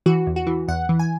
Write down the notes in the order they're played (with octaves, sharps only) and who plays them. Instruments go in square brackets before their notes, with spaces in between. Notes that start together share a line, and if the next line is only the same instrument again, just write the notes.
[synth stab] E3 F#4
E2
F#4
E3
E2 F#5
E3
G#5